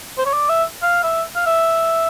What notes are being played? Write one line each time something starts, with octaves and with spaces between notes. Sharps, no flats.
C5
C#5
D5
E5
F5
E5
F5
E5